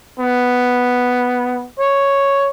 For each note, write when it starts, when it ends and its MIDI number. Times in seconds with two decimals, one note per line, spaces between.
0.19 1.65 59
1.79 2.49 73